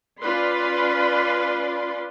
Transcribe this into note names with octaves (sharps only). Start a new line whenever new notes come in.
C#4 F4 B4 D5 B5 C6